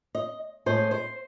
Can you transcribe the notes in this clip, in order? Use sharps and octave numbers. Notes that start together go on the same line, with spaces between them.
D#5
A2 G#3 C5
C5